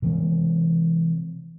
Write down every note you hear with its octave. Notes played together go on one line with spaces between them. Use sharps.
C3 E3 G#3 C4